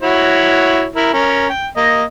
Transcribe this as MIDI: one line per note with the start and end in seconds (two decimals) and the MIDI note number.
0.02 0.87 64
0.02 0.87 66
0.02 0.87 73
0.96 1.10 64
0.96 1.10 70
1.13 1.48 61
1.13 1.48 70
1.50 1.67 79
1.77 2.03 58
1.77 2.03 75